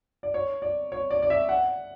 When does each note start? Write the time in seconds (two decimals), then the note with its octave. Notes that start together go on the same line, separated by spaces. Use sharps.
0.23 D5
0.34 C#5
0.62 D5
0.92 C#5
1.11 D5
1.22 D5
1.30 E5
1.49 F#5